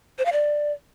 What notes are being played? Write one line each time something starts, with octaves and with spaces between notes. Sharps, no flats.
C5
F5
D5